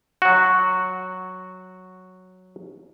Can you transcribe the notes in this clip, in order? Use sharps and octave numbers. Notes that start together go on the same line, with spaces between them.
F#3 F#4